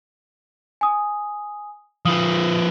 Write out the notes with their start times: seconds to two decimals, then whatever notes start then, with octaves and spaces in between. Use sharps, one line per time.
0.81 G#5 D#6
2.05 F3 B4 D#6